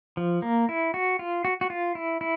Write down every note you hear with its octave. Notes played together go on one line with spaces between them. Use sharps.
F3
A#3
E4
F#4
F4
F#4
F#4
F4
E4
E4